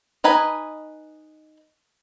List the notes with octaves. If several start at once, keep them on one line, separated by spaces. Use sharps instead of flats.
D#4 B4 D#5 G#5 B5